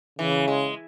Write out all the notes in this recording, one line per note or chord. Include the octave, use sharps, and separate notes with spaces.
C#3 E3
G#3